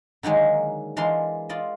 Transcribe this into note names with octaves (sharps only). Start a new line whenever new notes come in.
D3 D#3 F#3 G#3 A#3
E3 G#3 D4 A#4 F5 C6
F4 D5 D#5